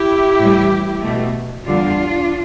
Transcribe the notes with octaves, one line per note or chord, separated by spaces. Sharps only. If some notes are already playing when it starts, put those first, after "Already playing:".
Already playing: E4 G4
A2 E3 G3
B2 A3
E2 D3 G3 D4 F4